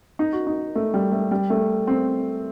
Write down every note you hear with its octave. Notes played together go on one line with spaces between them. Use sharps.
D#4
F#4
D#4
A3
G3
A3
G3
A3
C4